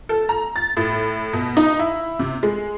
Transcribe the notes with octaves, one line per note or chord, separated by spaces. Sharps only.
A4
A#5
A6
A2
B2
D#4
E4
C3
G#3